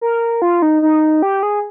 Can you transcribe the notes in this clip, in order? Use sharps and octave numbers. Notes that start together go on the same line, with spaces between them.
A#4
F4
D#4
D#4
G4
G#4